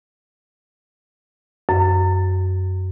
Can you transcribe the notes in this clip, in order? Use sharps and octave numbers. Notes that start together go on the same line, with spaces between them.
F#2